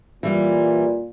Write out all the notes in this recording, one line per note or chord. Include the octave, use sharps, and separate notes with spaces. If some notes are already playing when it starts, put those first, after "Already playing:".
A#2 E3 G3